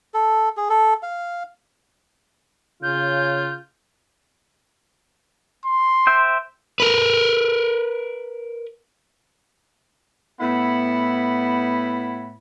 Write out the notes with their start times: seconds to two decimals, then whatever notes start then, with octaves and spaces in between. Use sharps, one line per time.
0.14 A4
0.57 G#4
0.70 A4
1.03 F5
2.83 C#3 F4 G6
5.65 C6
6.07 C5 E5 G5
6.80 A#4 B4
10.39 A2 B3 E4 F#5 B5